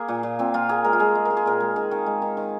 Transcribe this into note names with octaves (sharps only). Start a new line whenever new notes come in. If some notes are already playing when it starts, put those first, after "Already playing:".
Already playing: A#3 G#4
A#2
A#2
A#2 C4
A#2 F4
A#3 G#4
G#3 A#4
F4
G#3 G#4
G#3
A#4
G#3
G#4
A#2 A#4
G#3
D#3 G#4
D#3
G#3
D#3
D#3